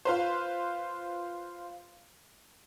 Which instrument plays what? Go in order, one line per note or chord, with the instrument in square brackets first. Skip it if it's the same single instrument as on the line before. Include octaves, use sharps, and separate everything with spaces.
[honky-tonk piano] F4 B4 C5